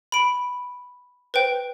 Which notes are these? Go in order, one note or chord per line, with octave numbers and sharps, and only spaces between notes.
B5 D7
B4 C5 G5